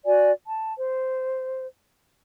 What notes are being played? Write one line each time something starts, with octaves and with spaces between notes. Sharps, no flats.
F#4 D5 G#5
A5
C5